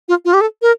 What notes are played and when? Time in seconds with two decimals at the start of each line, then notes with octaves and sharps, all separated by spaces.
0.08 F4
0.25 F4
0.33 G4
0.41 A4
0.62 A#4